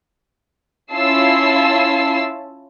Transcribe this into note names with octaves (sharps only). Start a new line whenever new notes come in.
C#4 E4 F4 A5 E6 C7